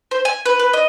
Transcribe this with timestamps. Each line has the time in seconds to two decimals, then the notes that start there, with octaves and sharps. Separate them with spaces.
0.11 C5
0.25 G#5
0.46 B4
0.60 B4
0.73 D#5